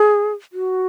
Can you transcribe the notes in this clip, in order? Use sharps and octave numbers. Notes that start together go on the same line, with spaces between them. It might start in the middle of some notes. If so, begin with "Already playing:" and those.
Already playing: G#4
F#4